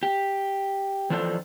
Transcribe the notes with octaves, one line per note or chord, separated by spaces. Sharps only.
G4
E3 F3 D4 A4 C5